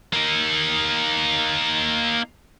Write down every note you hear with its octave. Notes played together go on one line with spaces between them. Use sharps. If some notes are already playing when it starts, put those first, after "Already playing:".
A#3 D#4